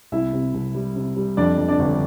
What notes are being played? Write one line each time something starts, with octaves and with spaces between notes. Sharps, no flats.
C2 E4 E5
C3
C2
G3
C3
G3
F2 D4 D5
F2
D4 D5
G1